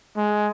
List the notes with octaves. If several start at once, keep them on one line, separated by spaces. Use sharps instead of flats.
G#3